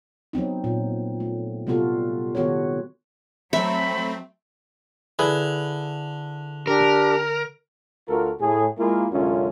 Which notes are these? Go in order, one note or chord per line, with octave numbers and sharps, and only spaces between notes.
F#3 B3 C4 D#4
A#2
A3
C3 G3 B3 F4 F#4 A4
D#3 B3 F#4 G4 A4 C#5
F#3 A3 C4 E5 B5
D3 E4 G#4 B4
D4 G4 A#4
D2 F4 F#4 A4 A#4
A2 G#4
G#3 A#3 E4 F4 G#4 A#4
C2 F#2 D3 G#3 C#4 F4